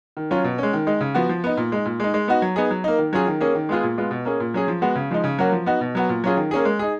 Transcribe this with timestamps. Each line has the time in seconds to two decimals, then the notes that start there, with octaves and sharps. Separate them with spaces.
0.17 D#3
0.31 F#3 C#4 F4
0.44 B2
0.58 G#3 C#4
0.73 D#3
0.87 G#3 D#4
1.01 C#3
1.14 F3 B3 F#4
1.29 F3
1.44 B3 D#4
1.57 A#2
1.72 G#3 D#4
1.85 A#2
2.00 G#3 D#4
2.14 G#3
2.28 B3 D#4 F#4
2.42 F#3
2.56 B3 D#4 G#4
2.71 F#3
2.84 A#3 D#4
2.98 D#3
3.13 F#3 C#4 F4 G#4
3.27 D#3
3.41 A#3 C#4 G#4
3.55 D#3
3.69 G#3 B3 F4 G#4
3.83 A#2
3.98 G#3 B3 F4
4.11 B2
4.25 A#3 C#4 G#4
4.40 A#2
4.54 F#3 C#4 G#4
4.68 F3
4.82 G#3 B3 F#4
4.96 C#3
5.11 F3 G#3 D#4
5.24 C#3
5.39 F#3 A#3 C#4 F#4
5.52 F3
5.66 B3 D#4 F#4
5.81 B2
5.95 F#3 B3 F#4
6.09 A#2
6.24 F#3 C#4 F4 G#4
6.37 D#3
6.51 A#3 C#4 G#4
6.65 G#3
6.79 D#4 G#4